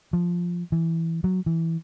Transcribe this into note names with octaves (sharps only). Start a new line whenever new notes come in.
F3
E3
F#3
E3